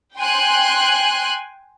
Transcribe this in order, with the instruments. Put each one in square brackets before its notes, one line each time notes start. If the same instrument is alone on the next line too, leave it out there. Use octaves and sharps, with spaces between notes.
[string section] G5 G#5 C6 F#6